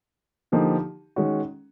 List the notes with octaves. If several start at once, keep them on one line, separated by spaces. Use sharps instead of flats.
D3 F3 A#3 D#4 G4
D#3 G#3 C#4 F#4